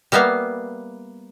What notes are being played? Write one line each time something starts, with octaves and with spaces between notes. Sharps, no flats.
G3 A#3 B3 E5 F5